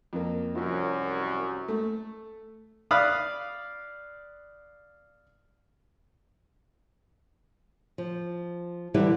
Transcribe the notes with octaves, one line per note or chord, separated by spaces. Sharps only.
F2 A#3
C2 F#2 F3
A3
D5 F5 B5 D#6 F#6
F3
D3 E3 G3 E4 G4 B4